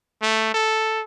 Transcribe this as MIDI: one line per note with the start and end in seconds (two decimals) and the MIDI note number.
0.22 0.50 57
0.54 1.03 69